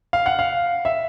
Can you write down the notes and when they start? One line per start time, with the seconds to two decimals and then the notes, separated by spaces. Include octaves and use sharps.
0.13 F5
0.26 F#5
0.39 F5
0.85 E5